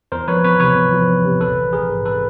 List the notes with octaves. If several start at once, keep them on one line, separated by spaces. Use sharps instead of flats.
E2 A#4 C5
F3 B4 C#5
E2 B4 C#5
C3 B4 C#5
E2
F3
E2
C3
A#1 A4 B4
E3
A#1 G#4 A#4
G#2
A4 B4